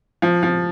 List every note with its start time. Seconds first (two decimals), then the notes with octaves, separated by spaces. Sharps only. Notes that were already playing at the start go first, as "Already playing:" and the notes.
0.22 F3
0.43 F3